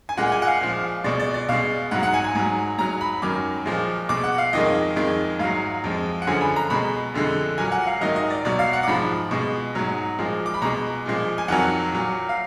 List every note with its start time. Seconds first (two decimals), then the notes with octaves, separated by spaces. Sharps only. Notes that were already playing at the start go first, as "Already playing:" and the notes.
0.09 G#5
0.17 A#2 G#3 F#5
0.32 G#5
0.42 F#5
0.47 F5
0.61 A#2 F3 G#3
1.04 B2 G#3 D5
1.20 D5
1.34 D5
1.49 B2 G#3 F5
1.91 G#2 F#3 F#5
2.03 F#5
2.14 G#5
2.24 G#5
2.35 G#2 F#3
2.78 G#2 F#3 A#5
3.01 B5
3.22 F#2 D#3 F#3 D6
3.66 A#2 F3 G#3
4.09 B2 G#3 D6
4.24 F#5
4.38 F5
4.53 F2 D#3 G#3 D#5
4.96 F2 D#3 G#3
5.39 G#2 F#3 F5
5.84 F2 F3 G#3
6.22 F#5
6.27 F#2 D3 F3 G#3 G#5
6.41 B5
6.56 A#5
6.70 B2 G#3 B5
7.14 F2 D3 G#3
7.58 A#2 F#3 G#5
7.72 F#5
7.87 F5
8.01 G#2 D#3 F#3 D#5
8.16 D#5
8.30 D5
8.45 B2 F#3 D5
8.59 F5
8.73 F#5
8.83 D6
8.88 G#2 F3 G#3 B5
9.31 B2 G#3
9.75 G#2 F#3
10.18 A#2 F3 G#3
10.46 D6
10.54 B5
10.62 B2 G#3 A#5
11.06 A#2 F3 G#3
11.38 G#5
11.48 F2 D#3 F#3 F#5
11.92 A#2 F#3
12.29 F5